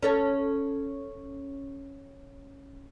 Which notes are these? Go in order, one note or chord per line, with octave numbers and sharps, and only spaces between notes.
C#4 A4 C#5